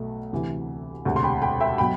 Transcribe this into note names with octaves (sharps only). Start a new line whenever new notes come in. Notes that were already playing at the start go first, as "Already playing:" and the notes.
Already playing: B1 B2 A3
D2 C3 E3
E1 D2 C3
C6
G5 B5
G5 B5
E5 G5
B2 F#3 G5 B5